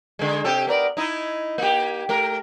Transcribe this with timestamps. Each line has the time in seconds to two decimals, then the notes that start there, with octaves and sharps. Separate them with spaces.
0.19 D3 G#3
0.44 C3 G4 A4
0.67 B3 A#4 D5
0.97 D#4 E4
1.58 A#3 G4
2.09 A3 A#4